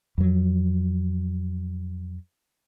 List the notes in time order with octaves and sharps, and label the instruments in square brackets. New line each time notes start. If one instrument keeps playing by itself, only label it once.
[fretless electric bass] F2 F#3